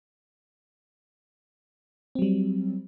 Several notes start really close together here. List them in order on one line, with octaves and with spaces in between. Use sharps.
C4 F#3 G3